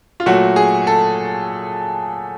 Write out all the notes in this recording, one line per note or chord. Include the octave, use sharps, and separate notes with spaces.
F4
A#2 F#3 A3 F#4
G#4
A4